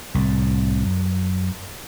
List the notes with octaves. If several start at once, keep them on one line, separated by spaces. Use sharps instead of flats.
C2 A2
F#2